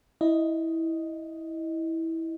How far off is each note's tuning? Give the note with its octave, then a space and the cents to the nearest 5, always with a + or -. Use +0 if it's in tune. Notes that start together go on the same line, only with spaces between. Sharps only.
E4 -15 D#5 +0